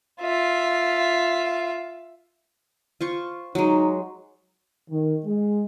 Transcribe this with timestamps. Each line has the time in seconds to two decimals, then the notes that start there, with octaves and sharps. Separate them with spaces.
0.21 F4 E5
3.01 F4 C5 C#6
3.55 F#3 G#3 D#4
4.90 D#3
5.25 G#3